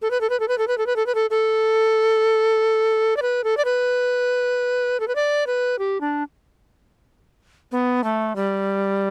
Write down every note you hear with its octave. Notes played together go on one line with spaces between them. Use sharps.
A4
B4
A4
B4
A4
B4
A4
B4
A4
B4
A4
B4
A4
A4
D5
B4
A4
D5
B4
A4
B4
D5
B4
G4
D4
B3
A3
G3